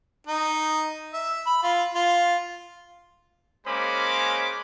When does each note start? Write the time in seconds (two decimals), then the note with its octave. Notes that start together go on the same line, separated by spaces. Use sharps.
0.27 D#4
1.14 E5
1.46 B5
1.63 F4
1.94 F4
3.67 G#3 A#3 C#4 C5 B5 D6